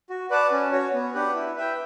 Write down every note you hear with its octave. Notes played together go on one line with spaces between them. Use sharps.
F#4
B4 D5 F#5 A5
C#4
F#4 C#5
B3
D4 G4 B4 F#5
E4
B4 E5 G5